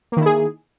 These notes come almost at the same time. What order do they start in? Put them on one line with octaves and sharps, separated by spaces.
A#3 D#3 E4 G#4